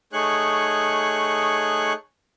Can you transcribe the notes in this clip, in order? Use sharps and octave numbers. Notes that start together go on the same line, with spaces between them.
A3 D#4 G#4 C#5 C#6 F#6